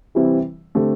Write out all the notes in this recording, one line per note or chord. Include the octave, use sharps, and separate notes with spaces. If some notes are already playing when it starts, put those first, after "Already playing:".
C3 E3 G3 C4 E4
D3 A3 C4 G4